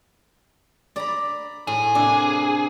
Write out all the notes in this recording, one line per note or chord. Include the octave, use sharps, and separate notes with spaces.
D5 A#5 B5
A2 G#4
C3 A#3 D4